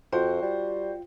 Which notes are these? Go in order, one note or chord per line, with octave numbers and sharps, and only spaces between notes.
F2 F4 F#4 C5 G5
G3